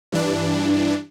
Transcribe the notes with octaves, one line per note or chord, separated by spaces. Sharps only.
G2 E3 D4